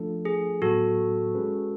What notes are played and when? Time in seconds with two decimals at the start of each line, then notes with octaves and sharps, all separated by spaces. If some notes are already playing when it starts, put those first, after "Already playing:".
Already playing: F3 A3 D4 F4 A4
0.25 G#4
0.62 A2 F#3 B3 F#4 A4
1.35 G#3 C#4 G#4 B4